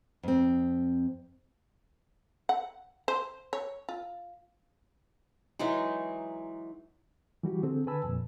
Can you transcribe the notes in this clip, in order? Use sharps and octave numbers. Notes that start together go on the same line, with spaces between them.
F2 C4
F#5
C5
C#5
F4
E3 F#3 G#3 D#4
E3 G3 F#4 G4
D3 C4 G#4 A4
D3 B4 G#5 A5 B5 E6
F2 A#2